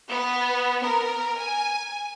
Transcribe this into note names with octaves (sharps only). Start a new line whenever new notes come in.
B3
A#4
G#5